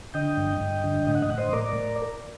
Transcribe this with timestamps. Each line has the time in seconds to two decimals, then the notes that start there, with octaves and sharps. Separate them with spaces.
0.14 D3 D#5 G5
0.37 G2
0.61 G2
0.84 D3
1.07 A2 D#5
1.15 F#5
1.22 D#5
1.30 A2 F#5
1.38 C5 D#5
1.53 A2 A#4 D5